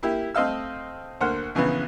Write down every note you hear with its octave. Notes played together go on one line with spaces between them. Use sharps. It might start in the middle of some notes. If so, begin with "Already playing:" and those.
A#3 E4 G4
A3 C4 D#5 F5 E6
D2 A#3 C5 F#5 F6
A#1 C#3 E3 B3